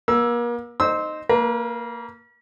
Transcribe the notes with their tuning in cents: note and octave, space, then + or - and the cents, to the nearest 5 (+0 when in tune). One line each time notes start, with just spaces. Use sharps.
A#3 +40 E6 +0
D#4 -10 C5 +0 E6 -25
A#3 -15 B4 -45